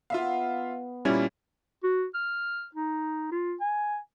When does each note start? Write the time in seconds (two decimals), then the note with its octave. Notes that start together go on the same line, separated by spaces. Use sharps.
0.10 B3 F4 E5 F5
1.05 A#2 G3 C#4 E4 G#6
1.83 F#4
2.14 F6
2.75 D#4
3.31 F4
3.60 G#5